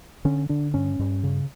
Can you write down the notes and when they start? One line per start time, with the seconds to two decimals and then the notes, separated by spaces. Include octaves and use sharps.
0.25 D3 C#4
0.49 D3 D4
0.74 G2 C#4
0.99 G2
1.23 C#3